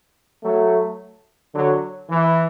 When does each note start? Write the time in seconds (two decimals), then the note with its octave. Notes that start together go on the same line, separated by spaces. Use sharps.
0.42 F#3 A3
1.54 D3 F#3
2.10 E3